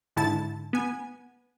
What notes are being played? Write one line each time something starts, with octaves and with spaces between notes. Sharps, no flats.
G#2 D3 E4 A5 A6
B3 G#5